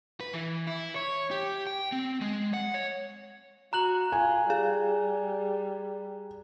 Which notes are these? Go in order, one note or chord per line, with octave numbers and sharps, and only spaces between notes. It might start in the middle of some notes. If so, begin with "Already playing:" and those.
B4
E3
E4
C#5
G4
G5
C4
G#3
F#5
C#5
F#4 A#5 F#6 F#7
F4 G#5
G3 G#4